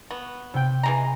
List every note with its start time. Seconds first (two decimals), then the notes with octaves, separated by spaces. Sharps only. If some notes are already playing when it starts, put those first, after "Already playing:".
0.11 B3 C#6
0.54 C3 G5
0.83 E3 G#3 A#5